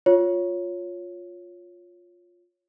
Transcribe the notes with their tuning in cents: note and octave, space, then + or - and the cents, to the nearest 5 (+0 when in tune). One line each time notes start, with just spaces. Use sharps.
F4 +10 C#5 +0